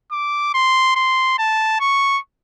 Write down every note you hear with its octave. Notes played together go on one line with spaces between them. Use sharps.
D6
C6
C6
A5
C#6